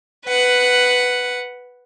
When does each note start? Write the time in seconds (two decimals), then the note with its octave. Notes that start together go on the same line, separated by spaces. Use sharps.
0.25 B4 F#5